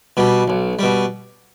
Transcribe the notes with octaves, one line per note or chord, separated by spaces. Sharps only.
B2 G3
B1
B2 G3